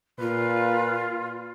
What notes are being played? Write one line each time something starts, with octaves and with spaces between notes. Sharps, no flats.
A#2 F4 B4